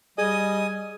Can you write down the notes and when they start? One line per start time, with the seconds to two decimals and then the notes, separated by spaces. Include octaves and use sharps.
0.18 G3 G#4 D#5 G#5 D#6